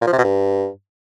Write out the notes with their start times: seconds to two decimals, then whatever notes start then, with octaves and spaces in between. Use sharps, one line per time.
0.02 A#2
0.07 F3
0.13 C3
0.18 B2
0.24 G2